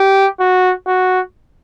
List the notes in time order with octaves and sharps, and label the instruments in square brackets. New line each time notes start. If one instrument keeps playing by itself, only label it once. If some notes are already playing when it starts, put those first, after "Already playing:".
Already playing: [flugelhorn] G4
F#4
F#4